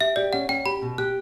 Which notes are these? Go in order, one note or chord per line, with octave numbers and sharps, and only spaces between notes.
G4 E5
G4 D5
C#4 F#5
C#4 G5
G4 B5
B2
G4 F#6